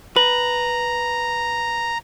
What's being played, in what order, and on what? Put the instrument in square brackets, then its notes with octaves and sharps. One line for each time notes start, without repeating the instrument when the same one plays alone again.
[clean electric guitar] B4 [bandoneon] A#5 [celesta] F#7